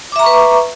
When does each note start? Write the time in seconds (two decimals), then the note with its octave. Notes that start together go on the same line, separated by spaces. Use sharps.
0.12 D6
0.16 E5
0.19 A#5
0.23 C#6
0.26 B4